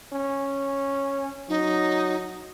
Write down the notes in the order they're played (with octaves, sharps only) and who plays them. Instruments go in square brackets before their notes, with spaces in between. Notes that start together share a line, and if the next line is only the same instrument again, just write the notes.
[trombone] C#4
[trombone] F#3 [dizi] D#4